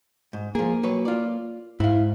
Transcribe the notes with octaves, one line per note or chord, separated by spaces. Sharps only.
G#2
F3 A#3 G#4
F#3 B4 C#5
F4 D5
G#2 E4 F5